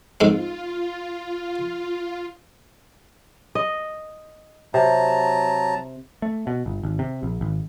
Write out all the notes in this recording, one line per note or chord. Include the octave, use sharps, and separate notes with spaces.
G#2 G#3 C4 F4
D#5
C3 F#3 A5 A#5
A3
B2
G1
G#1
C3
A#1
G#1